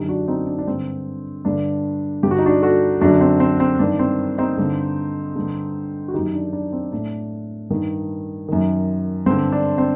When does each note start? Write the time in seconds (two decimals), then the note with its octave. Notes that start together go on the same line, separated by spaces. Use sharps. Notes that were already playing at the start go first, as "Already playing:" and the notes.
Already playing: F#2 D3 D#4 G4
0.09 D4 F#4
0.28 C4 D#4
0.47 D4
0.59 D4
0.67 G2 D3 C4
1.45 G2 D3 D4
2.23 G2 G4
2.26 D3 F#4
2.38 D#4
2.46 D4 F#4
2.62 F#4 A4
3.01 F#2 D3 D4 F#4
3.21 C4
3.40 C4
3.60 C4
3.79 G2 D#3 D4
3.99 C4
4.38 C4 D#4
4.58 G2 D3
5.36 G2 D3
6.08 F#4
6.14 F#2 D#3 D#4 G4
6.34 D4
6.53 D4
6.73 C4
6.92 A2 D4
7.70 G2 D#3
8.49 F#2 D#3
9.26 G2 D3 C4
9.52 D4
9.78 C4